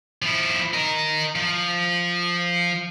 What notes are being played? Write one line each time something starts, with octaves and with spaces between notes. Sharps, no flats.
F3 E4
A#4 D#5
F3